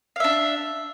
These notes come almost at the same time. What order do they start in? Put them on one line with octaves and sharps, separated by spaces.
F5 E5 D4